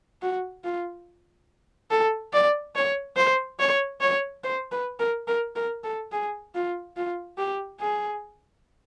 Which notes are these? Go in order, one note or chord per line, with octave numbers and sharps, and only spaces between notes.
F#4
F4
A4
D5
C#5
C5
C#5
C#5
C5
B4
A#4
A#4
A#4
A4
G#4
F4
F4
G4
G#4